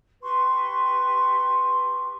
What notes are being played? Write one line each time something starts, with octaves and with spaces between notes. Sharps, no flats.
G4 B4 C6 C#6